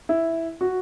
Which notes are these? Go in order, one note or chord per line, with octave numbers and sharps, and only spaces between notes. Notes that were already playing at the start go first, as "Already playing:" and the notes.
E4
F#4